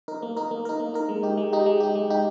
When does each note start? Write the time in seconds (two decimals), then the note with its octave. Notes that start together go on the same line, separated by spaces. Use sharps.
0.08 D#4 A#4
0.22 A#3
0.36 D#4 A#4
0.51 A#3
0.65 D#4 A#4
0.80 A#3
0.94 D#4 A#4
1.09 G#3
1.23 D#4 G4
1.37 G#3
1.53 D#4 G4
1.66 G#3
1.80 D#4 G4
1.95 G#3
2.10 D#4 G4